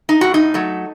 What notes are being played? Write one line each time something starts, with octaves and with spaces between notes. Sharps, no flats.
D#4
A2 F#4
D#4
F#3 A3